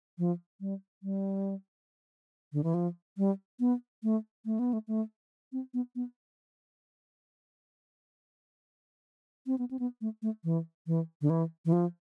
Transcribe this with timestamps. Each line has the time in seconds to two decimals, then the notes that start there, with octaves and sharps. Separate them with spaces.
0.18 F3
0.61 G3
1.03 G3
2.53 D3
2.64 E3
2.74 F3
3.18 G3
3.60 B3
4.03 A3
4.45 A3
4.59 B3
4.73 A3
4.88 A3
5.52 C4
5.74 B3
5.95 B3
9.47 C4
9.58 B3
9.71 C4
9.79 B3
10.01 A3
10.22 A3
10.44 E3
10.87 E3
11.21 D3
11.30 E3
11.65 E3
11.72 F3